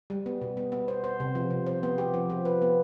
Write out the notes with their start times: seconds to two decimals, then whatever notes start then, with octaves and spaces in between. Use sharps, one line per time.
0.10 G3
0.26 B3
0.41 B2
0.57 B3
0.72 B3
0.88 C5
1.04 C5
1.20 C3
1.35 F3
1.51 C3
1.67 C5
1.83 B3
1.98 G4
2.14 F3
2.30 F3
2.45 B4
2.62 B3